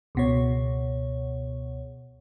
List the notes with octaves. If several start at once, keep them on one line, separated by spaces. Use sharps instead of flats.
C#2 B2 C#5